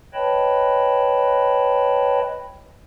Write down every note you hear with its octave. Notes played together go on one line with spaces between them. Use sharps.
B4 C#5 D#5 G5 A5 B5